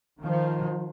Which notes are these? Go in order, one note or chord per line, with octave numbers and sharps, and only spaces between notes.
D#3 F3